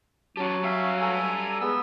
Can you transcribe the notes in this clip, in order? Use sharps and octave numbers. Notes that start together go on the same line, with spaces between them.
F#3 C#4 G4 A5
G3 C#4 E5 F5
A4 G#5 A#5
G#3 B3 E6